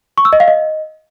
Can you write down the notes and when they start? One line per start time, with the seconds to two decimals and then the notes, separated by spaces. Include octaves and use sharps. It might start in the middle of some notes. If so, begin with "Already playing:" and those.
0.18 C#6
0.25 E6
0.33 D#5
0.40 F5
0.48 D#5